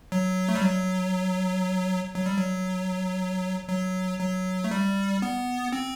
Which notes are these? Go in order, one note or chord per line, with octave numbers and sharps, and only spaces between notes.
F#3
A3
G3
F#3
F#3
G3
F#3
F#3
F#3
A3
G3
B3
C4